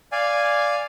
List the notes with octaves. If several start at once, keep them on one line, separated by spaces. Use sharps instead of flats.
D5 F5 G#5